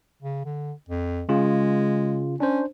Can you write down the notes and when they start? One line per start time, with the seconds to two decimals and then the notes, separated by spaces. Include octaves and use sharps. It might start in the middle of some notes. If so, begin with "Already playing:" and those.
0.22 C#3
0.45 D3
0.89 F2
1.29 C#3 G#3 F4
2.40 C#4 D4 C5